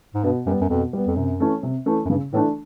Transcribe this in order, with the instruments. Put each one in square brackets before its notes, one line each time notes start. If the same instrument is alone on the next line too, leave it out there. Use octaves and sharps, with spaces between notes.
[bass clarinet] G#2
[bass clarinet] G2 [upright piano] B2
[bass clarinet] F#2 [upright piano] G3 B3
[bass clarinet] F#2
[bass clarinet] F2 [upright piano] B2
[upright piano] G3 B3
[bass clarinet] F2
[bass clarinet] F#2 [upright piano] C3
[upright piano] E3 A3 C#4
C3
E3 A3 C#4
[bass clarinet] F#2
[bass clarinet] G2 [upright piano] C#3
[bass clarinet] A2 [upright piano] E3 A3 D4